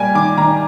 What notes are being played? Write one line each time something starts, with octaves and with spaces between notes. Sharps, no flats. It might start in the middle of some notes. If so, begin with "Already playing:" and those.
Already playing: G3 A#3 G5 G#5
D#3 D6
D#3 A#5